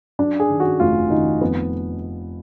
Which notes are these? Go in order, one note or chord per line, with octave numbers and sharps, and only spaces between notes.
F#3 D4
G#4
D#3
F#4
F1 F4
D#3 D#4
F2 B3